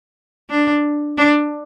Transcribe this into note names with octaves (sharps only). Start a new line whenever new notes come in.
D4
D4